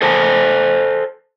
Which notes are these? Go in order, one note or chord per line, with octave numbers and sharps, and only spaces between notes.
A4 C5 G#5 A5